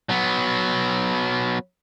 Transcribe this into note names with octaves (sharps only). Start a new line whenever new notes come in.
F#3 B3